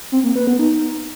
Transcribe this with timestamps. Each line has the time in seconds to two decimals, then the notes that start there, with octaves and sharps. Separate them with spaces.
0.12 C4
0.24 A#3
0.36 B4
0.47 B3
0.59 D#4